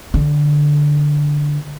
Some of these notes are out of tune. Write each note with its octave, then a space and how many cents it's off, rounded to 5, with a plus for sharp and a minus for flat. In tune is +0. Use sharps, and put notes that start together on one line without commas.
D3 +0